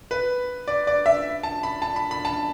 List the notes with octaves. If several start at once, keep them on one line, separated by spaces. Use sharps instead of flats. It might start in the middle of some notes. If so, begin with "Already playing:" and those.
B4
D5
D5
E5
A5
B5
A5
B5
B5
A5